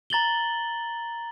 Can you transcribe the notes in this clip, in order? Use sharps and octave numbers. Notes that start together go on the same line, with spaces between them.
A#5 A6 F#7 G7